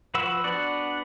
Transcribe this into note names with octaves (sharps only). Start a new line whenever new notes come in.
F3 F#4 B4 F#5 E6
B3 D4 F#4 D5 F#5